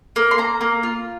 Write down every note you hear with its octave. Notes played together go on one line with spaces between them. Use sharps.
A#3
C6
A#3 A#5
A#3
F4